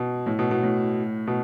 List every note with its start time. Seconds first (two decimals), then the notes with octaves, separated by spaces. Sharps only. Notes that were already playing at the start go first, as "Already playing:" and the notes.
Already playing: B2
0.26 A2
0.39 B2
0.51 B2
0.63 A2
1.27 B2